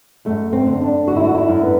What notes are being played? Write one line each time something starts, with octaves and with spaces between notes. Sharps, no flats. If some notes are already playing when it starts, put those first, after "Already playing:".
F#2 A3
C4
D3
D4
D3 F#4
E4
F#4
E4
F#2
B3